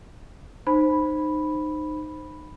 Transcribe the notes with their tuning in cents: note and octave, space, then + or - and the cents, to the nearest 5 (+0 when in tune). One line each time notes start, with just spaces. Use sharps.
D#4 -25 C5 +0 B5 +0